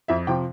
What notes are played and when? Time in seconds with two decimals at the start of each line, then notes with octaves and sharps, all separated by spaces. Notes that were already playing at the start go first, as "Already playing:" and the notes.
0.08 F2 E5
0.27 C3 F3 G5